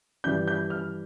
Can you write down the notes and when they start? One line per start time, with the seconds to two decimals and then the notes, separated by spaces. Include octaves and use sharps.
0.24 G2 E3 G3 G6
0.48 G6
0.70 F6